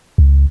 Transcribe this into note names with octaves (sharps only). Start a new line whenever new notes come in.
C#2